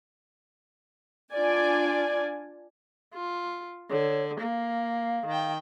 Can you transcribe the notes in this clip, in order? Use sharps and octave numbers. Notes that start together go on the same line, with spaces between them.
D4 F4 D5 G#5
F4
D3 C#5
A#3 F5
D#3 G5